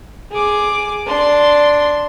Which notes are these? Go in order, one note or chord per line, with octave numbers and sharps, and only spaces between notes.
G#4 D6
D4 C6